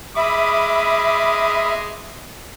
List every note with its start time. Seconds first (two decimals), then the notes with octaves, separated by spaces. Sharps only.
0.16 G#3 E5 B5 D6 D#6